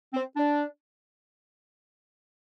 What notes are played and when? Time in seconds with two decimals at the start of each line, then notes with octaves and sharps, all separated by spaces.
0.14 C4
0.36 D4